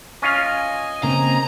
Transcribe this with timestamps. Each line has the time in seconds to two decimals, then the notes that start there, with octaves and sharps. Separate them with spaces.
0.22 C#4 F4 D#5 F5 G#5
1.03 C#3 A#3 C4 A#5